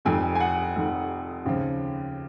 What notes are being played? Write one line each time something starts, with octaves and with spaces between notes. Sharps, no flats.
F1 F2 D#3 G#5
G#5
F#5
F1 F2 D#3
D#2 C#3 F3